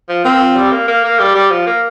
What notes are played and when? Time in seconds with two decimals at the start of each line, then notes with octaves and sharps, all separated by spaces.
0.09 F3
0.25 A#3 C4
0.40 F3
0.56 G3
0.72 A#3
0.88 A#3
1.04 A#3
1.20 G3
1.35 G3
1.51 F3
1.67 A#3